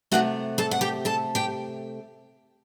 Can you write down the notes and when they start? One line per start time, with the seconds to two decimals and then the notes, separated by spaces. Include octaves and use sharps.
0.12 C3 D#3 A3 F#4 F#5
0.58 A4 A5
0.71 F#5
0.81 G4 G5
1.05 A4 A5
1.35 G4 G5